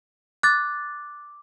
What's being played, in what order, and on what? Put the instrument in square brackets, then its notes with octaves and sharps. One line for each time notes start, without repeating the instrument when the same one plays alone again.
[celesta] D6 [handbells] F#6 A6